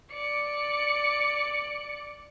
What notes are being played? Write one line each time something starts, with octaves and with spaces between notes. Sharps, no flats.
D5 C#7